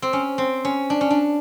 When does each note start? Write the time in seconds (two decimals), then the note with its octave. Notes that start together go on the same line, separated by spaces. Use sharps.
0.02 C4
0.13 C#4
0.38 C4
0.65 C#4
0.90 D4
1.01 C#4
1.11 D4